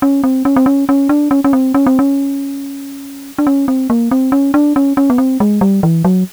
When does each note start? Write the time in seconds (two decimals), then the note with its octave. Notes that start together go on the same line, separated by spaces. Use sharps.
0.02 C#4
0.24 C4
0.45 C#4
0.56 C4
0.66 C#4
0.89 C#4
1.09 D4
1.31 C#4
1.44 C#4
1.53 C4
1.74 C#4
1.86 C4
1.99 C#4
3.38 D4
3.47 C#4
3.68 C4
3.90 A#3
4.11 C4
4.32 C#4
4.54 D4
4.76 C#4
4.97 C#4
5.10 B3
5.18 C4
5.40 G#3
5.61 G3
5.83 E3
6.05 F#3